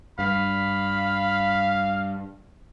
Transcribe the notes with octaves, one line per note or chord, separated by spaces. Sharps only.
G2 F5 B5